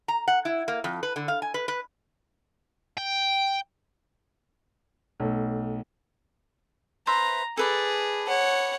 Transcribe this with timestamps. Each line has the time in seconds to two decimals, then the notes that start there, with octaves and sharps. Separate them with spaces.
0.08 A#5
0.28 F#5
0.45 E4
0.68 A#3
0.84 F2
1.03 B4
1.16 D3
1.28 F5
1.42 G#5
1.54 B4
1.68 B4
2.98 G5
5.20 B1 A3
7.07 B4 C5 E5 A#5
7.57 G#4 A4 B4 D5
8.28 C#5 F#5